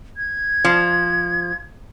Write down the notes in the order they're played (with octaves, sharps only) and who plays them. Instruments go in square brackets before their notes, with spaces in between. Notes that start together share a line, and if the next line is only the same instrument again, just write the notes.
[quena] G#6
[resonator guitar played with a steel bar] F3